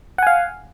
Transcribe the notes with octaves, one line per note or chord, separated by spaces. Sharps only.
F5 F#5 G#5